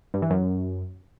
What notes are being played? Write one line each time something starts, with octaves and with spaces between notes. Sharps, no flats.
G2
E3
F#2